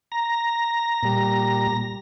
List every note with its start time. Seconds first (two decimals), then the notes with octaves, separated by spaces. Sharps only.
0.12 A#5
1.03 A#2 G3